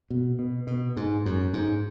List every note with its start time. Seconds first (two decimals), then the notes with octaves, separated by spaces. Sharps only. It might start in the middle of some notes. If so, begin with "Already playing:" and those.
0.10 B2
0.39 B2
0.67 B2
0.97 G#2
1.26 F#2
1.53 G#2